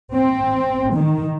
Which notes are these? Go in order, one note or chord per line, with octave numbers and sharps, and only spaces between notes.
C4
D#3